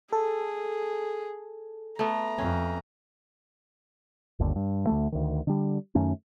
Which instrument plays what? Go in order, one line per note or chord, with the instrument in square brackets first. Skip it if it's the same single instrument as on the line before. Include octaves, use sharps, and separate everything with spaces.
[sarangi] G#4 [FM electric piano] A4
[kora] A3 B3 [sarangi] A#5
[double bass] F2 [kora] C#4
[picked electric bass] G1 D#2 D3
G2
D2 G3 A3
D2 D#3
D3 G3
F#2 D#3 A3 C#4